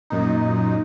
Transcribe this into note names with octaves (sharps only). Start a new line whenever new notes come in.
F#2 A#2 D#4